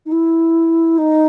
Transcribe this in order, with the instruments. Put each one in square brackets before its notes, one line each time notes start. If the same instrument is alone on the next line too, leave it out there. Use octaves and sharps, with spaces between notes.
[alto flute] D#4
E4
D#4